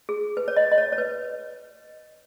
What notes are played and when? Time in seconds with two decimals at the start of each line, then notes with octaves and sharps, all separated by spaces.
0.09 G#4
0.37 B4
0.48 C#5
0.57 D#5
0.72 D#5
0.78 C#5
0.92 C#5
0.98 B4